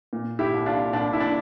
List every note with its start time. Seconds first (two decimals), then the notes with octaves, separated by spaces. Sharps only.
0.13 A#2
0.39 E4 G4
0.54 C2
0.66 D4 F4
0.93 C2 D4
1.13 E4
1.20 D4